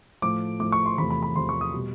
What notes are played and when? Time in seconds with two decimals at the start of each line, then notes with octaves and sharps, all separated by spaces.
0.22 A2 F3 A3 D6
0.60 A2 F3 A3 D6
0.72 C#6
0.86 C6
0.98 E2 C3 F3 A3 B5
1.10 B5
1.22 B5
1.36 E2 C3 F3 A3 C6
1.49 C#6
1.61 D#6
1.73 B2 G3